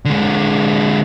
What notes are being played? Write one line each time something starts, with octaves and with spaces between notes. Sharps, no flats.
D3 G#3